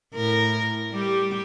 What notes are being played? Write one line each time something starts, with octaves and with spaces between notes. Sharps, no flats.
A2 A#4
G3 G4